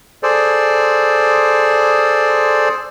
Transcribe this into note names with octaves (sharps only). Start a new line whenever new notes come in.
G#4 A4 C5 D5